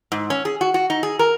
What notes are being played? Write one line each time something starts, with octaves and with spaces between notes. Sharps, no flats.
G#2
C#4
G#4
F#4
F#4
D#4
G#4
A#4